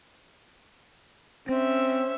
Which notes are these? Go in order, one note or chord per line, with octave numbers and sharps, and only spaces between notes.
C4 C#4 C5 E5